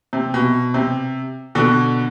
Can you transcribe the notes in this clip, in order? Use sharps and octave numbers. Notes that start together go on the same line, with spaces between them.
C3
B2
C3
B2 D3